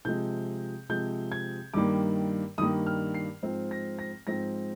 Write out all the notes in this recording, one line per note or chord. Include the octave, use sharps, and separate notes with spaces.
C3 F3 G#3 G6
C3 F3 G#3 G6
G#6
G2 D#3 G3 A#3 D6
G2 D#3 G3 A#3 D#6
F6
C7
G#2 F3 C4
A#6
A#6
G#2 F3 C4 A#6